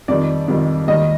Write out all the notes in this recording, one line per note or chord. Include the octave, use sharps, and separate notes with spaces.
F2 D#3 G3 D5
F2 D#3 G3
D#2 D#3 G3 D#5